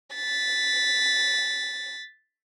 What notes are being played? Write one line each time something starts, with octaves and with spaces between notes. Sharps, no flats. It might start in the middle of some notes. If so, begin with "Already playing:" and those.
A6 B6